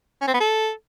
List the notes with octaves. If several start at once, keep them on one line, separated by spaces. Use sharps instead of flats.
C#4
C4
B3
A4